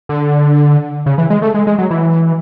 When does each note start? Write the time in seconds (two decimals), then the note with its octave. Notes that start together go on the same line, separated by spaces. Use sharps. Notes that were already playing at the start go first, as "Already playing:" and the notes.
0.09 D3
1.06 C#3
1.18 E3
1.30 G#3
1.42 A3
1.54 G#3
1.67 G#3
1.78 F#3
1.91 E3